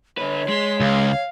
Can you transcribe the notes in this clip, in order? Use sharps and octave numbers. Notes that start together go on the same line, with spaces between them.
D3 B4 C#5
G#3 C6 B6
C#2 F5